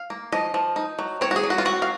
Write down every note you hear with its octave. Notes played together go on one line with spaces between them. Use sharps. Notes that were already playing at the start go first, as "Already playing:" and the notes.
Already playing: F5
A#3
F3 D#5
F3
D#4
F#3
C4 C#5
F#4
G#4
F#3
F#4
F4
C4 F#4
F5